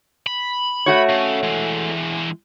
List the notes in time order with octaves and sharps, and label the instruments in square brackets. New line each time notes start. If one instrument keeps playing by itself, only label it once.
[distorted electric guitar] B5
[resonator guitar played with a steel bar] A3 F#4 C#5
[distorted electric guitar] C#3
E3 G#3